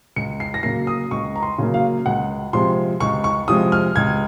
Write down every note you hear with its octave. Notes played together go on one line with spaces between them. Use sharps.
C#2 C#7
C7
A#6
C#3 F#3 A#3 C7
D#6
C#2 C#6
A#5
C6
C#3 F#3 A#3
F5
C#2 F#5
C3 F3 G#3 C6
C#2 C#6
C#6
C3 F3 G#3 D#6
F6
C#2 G#6